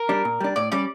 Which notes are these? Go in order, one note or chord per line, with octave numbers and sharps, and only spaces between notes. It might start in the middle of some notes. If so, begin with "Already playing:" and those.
Already playing: A#4
G3 D4
A#2
G3 D4
A2 D5
G3 C#4 D5